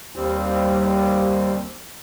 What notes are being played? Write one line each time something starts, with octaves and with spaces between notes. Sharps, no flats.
D#2 G3 C4